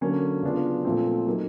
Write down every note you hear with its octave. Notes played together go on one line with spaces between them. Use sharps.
D3 F#3 A#3 C#4
C#3 F#3 B3 D4 F4
A#2 F3 A3 C4
F#3 A#3 D#4